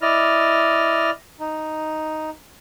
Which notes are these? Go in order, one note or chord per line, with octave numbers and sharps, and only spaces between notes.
E4 D5 D#5 F6
D#4